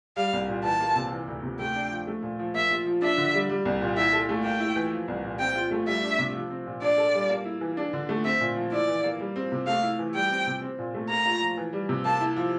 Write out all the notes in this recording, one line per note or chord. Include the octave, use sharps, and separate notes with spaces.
G3 F5
C2
A#2
E3 A5
A#3
C3
E3
D2
C3
A3 G5
D4
F3
A3
A#2
F3
A#3 E5
F4
F3
D4 E5
D3
G3
G3
C2
A#2
E4 E5
A4
A3
A#3 G5
E4
E3
F3
C2
A#2
C4 G5
F4
A3
G3 E5
D4
C3
F3
C4
A#2
D4 D5
A4
G3
A#3
E4
E3
D4
D3
A3
C4 E5
A#2
F3
E4 D5
E3
A#3
G3
C4
C3
A3 F5
E4
E3
G3 G5
C4
C3
C4
A#2
A3
A#3 A#5
F4
F3
E3
G3
C3
A#3 A5
E4
F3